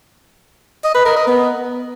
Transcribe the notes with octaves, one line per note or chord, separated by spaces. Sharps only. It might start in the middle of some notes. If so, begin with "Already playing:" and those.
D#5
B4
A#4
D#5
B3